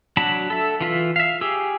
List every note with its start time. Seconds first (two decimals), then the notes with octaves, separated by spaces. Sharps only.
0.17 F#3 D4 F#4 A5 B5
0.50 A4 E5
0.81 E3 F4 E5
1.16 E5 F5
1.41 G4 G#4 E6